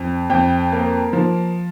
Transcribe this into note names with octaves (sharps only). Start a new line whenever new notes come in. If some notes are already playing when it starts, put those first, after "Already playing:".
Already playing: F2
F2 G5
A#3
F3